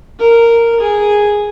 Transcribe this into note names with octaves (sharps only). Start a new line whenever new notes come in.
A#4
G#4